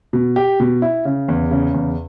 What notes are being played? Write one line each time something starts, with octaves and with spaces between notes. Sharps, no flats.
B2
G4
B2
E4
C#3
E2
C#3
E2